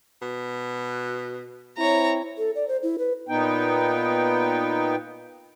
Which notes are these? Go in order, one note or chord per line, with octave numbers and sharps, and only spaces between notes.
B2
C4 E4 C#5 A#5
A4
D5
C5
E4
B4
A#2 B3 D#4 G5